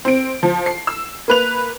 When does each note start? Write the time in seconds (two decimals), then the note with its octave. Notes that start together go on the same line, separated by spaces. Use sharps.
0.05 C4 D7
0.43 F3
0.66 C7
0.87 E6
1.28 A#3 B4 F7